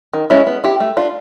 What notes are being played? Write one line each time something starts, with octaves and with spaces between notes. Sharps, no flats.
D#3
G#3 C#4 E4
B3
E4 G4
A3
D4 F4